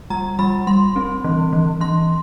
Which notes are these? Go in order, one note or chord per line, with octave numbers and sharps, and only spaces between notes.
G3 A#5
G3 B5
G3 C6
C4
E3
E3
E3 C6